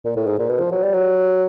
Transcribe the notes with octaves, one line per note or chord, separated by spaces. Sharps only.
A#2
A2
G#2
A#2
B2
F3
F#3
G3
F#3